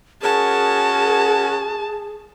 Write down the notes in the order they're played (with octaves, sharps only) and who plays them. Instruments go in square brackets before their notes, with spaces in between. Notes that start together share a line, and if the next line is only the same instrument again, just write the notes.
[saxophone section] C#4 F#4 A#4 [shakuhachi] G#4 [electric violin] A5